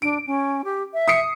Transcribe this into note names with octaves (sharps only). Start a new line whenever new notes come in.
D4 D7
C#4
G4
E5
D#6 C7 C#7